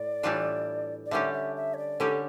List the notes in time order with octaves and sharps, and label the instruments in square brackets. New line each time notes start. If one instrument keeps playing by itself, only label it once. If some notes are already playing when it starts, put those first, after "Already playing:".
Already playing: [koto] A2 [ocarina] D5
[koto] A2 E3 G3 D4 F4
[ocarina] D5
[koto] D3 G3 C#4 G4 [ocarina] E5
[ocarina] E5
E5
C#5
D5
[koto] D3 G3 C#4 G4 [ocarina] A4